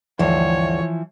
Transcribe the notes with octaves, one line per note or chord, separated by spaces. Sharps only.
D2 G2 E3 F3 C#5